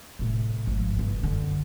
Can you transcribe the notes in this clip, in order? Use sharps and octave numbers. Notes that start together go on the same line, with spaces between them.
A2 C3
G#1 F3
G1 C#3
F#2 D3